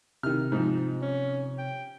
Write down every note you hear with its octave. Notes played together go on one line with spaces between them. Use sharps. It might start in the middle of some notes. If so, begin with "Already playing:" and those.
C3 D#3 F6
G#2 F3 D#4
C#4
G5